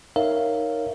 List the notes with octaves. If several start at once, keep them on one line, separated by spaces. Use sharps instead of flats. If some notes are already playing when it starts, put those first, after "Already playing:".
D#4 A#4 C#5 E5 F5